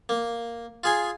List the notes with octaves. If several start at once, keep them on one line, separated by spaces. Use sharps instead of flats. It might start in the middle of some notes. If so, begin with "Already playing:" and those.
A#3
F4 G#4 G#5